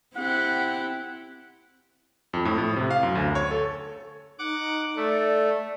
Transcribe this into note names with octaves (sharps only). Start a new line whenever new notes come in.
C4 E4 G4 F#5
F2
A2
A2
C3
F5
F#2
D2
C#5
A4
D#4 F#5 D6
A3 D5